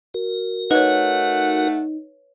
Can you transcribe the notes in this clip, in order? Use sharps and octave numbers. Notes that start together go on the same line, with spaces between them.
F#4 A#4
A3 D#4 B4 C#5 F#5